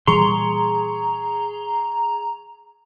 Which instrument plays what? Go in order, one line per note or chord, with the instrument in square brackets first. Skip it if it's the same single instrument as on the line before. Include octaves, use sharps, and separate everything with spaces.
[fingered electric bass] A#2 E3 G3 [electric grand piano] G#4 C#6 [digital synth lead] A#5 [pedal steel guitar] C6